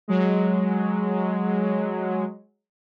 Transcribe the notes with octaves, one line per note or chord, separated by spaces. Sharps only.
F#3 G#3